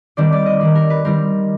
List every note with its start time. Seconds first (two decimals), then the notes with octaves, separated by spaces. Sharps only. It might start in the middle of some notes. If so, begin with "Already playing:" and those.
0.17 D#3 G3 C4 D5
0.32 D5
0.46 D#5
0.61 D#3 G3 C4 D5
0.75 A#4
0.90 B4
1.04 D#3 G3 C4 A#4